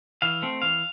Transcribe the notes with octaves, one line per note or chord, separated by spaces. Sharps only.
E3 F5
A3 C4
E3 F5